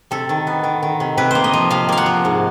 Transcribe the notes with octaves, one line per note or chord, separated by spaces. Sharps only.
C3 A4
D#3
B3
D#3
D#3
C3
C3 B4
A#3 C5
D#5
F3
C3 F5
A#3 F5
F#5
F3
G#2